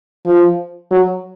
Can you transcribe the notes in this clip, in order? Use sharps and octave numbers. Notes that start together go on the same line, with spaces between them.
F3
F#3